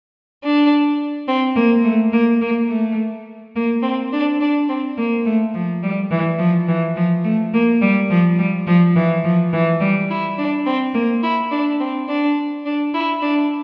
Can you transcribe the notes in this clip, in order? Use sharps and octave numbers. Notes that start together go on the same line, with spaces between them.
D4
C4
A#3
A3
A#3
A#3
A3
A#3
C4
D4
D4
C4
A#3
A3
F3
G3
E3
F3
E3
F3
A3
A#3
G3
F3
G3
F3
E3
F3
E3
G3
E4
D4
C4
A#3
E4
D4
C4
D4
D4
E4
D4